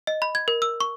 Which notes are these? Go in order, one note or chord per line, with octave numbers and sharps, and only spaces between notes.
D#5
B5
G#6
A#4
E6
C#6